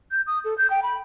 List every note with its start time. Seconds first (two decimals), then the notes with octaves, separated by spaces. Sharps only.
0.11 G6
0.27 D#6
0.45 A4
0.58 G6
0.70 G5
0.83 B5